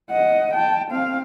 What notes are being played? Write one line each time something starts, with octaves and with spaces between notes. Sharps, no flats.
D#5 F#5
G5 A5
C4 F5